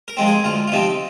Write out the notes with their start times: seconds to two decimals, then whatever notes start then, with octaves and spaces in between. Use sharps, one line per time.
0.08 A#4
0.17 F3 G#3 C4
0.27 G#4
0.44 D2 F4
0.68 F4
0.72 C3 F3 C4 D#4